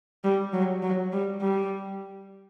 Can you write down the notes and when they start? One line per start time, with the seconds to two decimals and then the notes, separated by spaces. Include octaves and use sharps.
0.24 G3
0.53 F#3
0.83 F#3
1.13 G3
1.41 G3